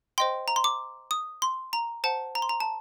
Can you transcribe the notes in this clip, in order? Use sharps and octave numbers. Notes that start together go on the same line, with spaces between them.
C5 D#5 G5 C6
A#5
C6
D6
D#6
C6
A#5
C5 F#5 A5
A#5
C6
A#5
A5